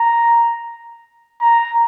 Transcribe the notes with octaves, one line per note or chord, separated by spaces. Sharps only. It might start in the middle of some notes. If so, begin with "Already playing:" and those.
Already playing: A#5
A#5